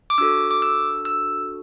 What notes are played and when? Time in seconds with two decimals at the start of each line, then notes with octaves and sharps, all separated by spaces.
0.10 D6
0.18 D4 F#4 A4 E6
0.51 D6
0.62 E6
1.05 E6